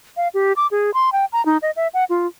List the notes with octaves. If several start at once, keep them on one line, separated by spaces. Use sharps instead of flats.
F5
G4
D6
G#4
C6
G5
A#5
D#4
D#5
E5
F#5
F4